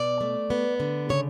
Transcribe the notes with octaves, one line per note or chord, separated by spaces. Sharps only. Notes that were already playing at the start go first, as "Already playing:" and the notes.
Already playing: B2 D5
A3
B3
D3
C#3 C#5